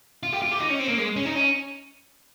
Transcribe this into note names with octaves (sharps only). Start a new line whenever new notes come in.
F4
G4
F4
G4
D#4
C#4
C4
A#3
G#3
C#4
D#4
C#4